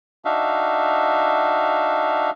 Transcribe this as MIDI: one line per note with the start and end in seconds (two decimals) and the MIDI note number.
0.25 2.30 62
0.25 2.30 63
0.25 2.30 66
0.25 2.30 76
0.25 2.30 77